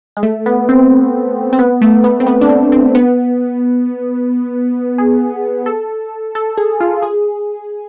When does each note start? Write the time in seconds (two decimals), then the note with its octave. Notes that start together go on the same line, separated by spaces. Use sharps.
0.17 G#3
0.23 A3
0.46 B3
0.69 C4
1.53 C4
1.59 B3
1.81 A3
2.04 B3
2.20 C4
2.27 B3
2.41 D4
2.49 C4
2.72 C4
2.95 B3
4.98 G#4
5.66 A4
6.35 A4
6.57 G#4
6.80 F4
7.02 G#4